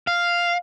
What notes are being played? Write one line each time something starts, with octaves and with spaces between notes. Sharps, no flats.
F5